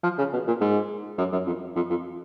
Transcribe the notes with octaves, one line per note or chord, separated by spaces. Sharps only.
F3
C#3
B2
A#2
G#2
F#2
F#2
F2
F2
F2